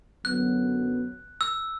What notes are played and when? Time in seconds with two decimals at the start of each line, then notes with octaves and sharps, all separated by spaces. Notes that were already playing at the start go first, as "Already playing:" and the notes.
0.25 F#2 D3 F#3 B3 F#6
1.41 E6